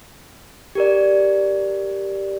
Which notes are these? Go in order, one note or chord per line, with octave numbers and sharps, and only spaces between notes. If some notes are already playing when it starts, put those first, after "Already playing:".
G4 A#4 D5